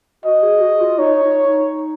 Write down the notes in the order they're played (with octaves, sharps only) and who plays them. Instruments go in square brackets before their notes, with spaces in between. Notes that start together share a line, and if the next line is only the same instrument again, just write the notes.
[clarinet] F#4 [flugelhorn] D#5
[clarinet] G#4
F#4
F4
[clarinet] D#4 [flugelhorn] C#5
[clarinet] D#4
D#4